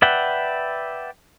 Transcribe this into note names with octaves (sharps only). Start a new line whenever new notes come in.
B4 D5 E5 F#5 G5